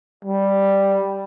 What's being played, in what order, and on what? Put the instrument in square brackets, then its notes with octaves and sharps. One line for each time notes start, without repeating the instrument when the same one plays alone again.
[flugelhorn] G3